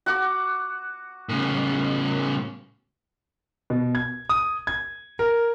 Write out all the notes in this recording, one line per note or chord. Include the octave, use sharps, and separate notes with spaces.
F#4 F#5 D6
A2 C#3
B2
G#6
D#6
G#6
A#4